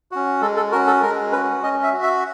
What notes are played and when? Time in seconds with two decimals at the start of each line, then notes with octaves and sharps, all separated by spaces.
0.12 C#4 F#4
0.42 G#3 A4
0.57 A4
0.72 F#4 A#4
0.75 C#4
0.87 A4
1.02 G#3 A#4
1.32 C#4 F#4 B4
1.63 C#4 D#5
1.83 E5
1.93 F#4
2.03 E5